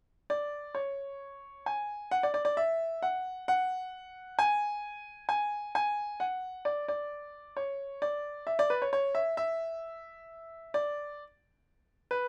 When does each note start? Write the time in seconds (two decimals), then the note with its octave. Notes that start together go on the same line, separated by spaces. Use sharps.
0.30 D5
0.75 C#5
1.66 G#5
2.11 F#5
2.23 D5
2.34 D5
2.45 D5
2.57 E5
3.02 F#5
3.48 F#5
4.39 G#5
5.29 G#5
5.75 G#5
6.20 F#5
6.65 D5
6.88 D5
7.57 C#5
8.02 D5
8.47 E5
8.59 D5
8.70 B4
8.82 C#5
8.93 C#5
9.15 E5
9.37 E5
10.74 D5
12.11 B4